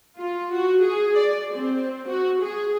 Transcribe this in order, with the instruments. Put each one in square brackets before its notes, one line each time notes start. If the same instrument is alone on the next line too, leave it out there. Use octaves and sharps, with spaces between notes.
[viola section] F4
F#4
G#4
D5
C4
F#4
G#4